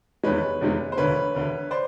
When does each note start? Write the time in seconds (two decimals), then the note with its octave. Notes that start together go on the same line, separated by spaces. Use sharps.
0.23 F1 E2 C3 D#3 G#3 B4 C#5
0.61 F1 E2 C3 D#3 G#3
0.92 C5
0.97 E1 D2 D3 B4 C#5
1.35 E1 D2 D3
1.71 C5 D5